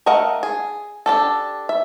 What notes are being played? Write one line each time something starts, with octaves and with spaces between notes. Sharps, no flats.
A3 A#4 D#5 F5 F#5
G#4
D4 G4 A4
E5